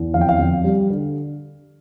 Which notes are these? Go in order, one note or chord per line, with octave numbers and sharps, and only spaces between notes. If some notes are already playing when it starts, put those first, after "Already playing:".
Already playing: E2
F2 F5
G5
F5
F2
G3
D3